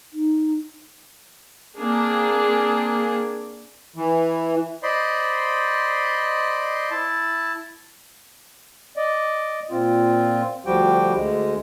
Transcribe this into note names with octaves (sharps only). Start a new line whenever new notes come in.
D#4
A#3 C4 D4 G#4
E3
C5 D5 D#5 B5 C6
E4 A5
D5 D#5
A#2 C4 F4
D2 F3 G3 F#4 G4 G5
D2 G#3